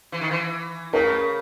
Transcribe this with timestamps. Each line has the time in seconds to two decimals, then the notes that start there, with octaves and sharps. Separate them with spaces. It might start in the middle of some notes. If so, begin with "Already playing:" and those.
0.12 E3
0.21 D#3
0.31 E3
0.93 C#3 A#4